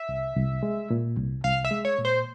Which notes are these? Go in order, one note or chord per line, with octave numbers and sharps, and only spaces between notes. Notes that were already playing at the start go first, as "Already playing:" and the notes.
Already playing: E5
C2
C2
G#3
A#2
C2
C2 F5
E5
G#3
C#5
A#2
C5